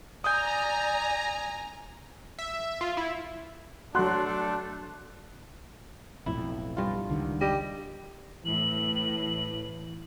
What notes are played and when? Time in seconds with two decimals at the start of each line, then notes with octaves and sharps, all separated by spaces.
0.24 D5 G#5 A#5 D#6 G6
2.39 E5
2.81 F4
2.97 E4
3.95 F#3 A3 D4 F#4 C6 F#6
6.26 B1 F2 A2 E4
6.77 G2 F4
7.10 C#2 D3 D#3
7.41 G3 D#5
8.45 A2 E3 F#7